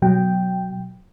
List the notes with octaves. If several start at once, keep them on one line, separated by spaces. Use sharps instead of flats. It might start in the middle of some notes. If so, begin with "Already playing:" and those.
B2 F#3 G5